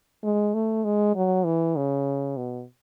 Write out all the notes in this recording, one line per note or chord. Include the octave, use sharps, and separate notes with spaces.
G#3
A3
G#3
F#3
E3
C#3
B2